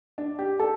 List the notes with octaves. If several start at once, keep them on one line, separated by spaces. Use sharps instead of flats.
D4
G4
A4